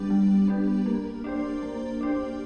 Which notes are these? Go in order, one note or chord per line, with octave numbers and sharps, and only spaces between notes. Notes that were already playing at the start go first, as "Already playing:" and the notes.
Already playing: G3 B3 D4 G4
G3
B3 D4 G4
A#3
D4 G4 C5
A#3
D4 G4 C5